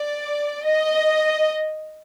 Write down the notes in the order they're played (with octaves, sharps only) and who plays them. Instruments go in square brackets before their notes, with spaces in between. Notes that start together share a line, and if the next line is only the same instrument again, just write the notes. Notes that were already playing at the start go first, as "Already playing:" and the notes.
Already playing: [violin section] D5
D#5